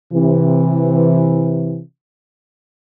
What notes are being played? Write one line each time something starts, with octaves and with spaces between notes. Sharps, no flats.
C3 E3